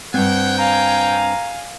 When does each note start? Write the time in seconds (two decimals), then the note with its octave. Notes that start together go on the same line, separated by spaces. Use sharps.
0.14 G2 C4 C#5 F#5 G5
0.58 F5 G#5 A#5